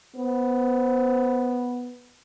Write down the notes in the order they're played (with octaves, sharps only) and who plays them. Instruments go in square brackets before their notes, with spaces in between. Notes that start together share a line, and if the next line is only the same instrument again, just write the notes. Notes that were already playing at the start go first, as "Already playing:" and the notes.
[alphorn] B3 [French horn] C5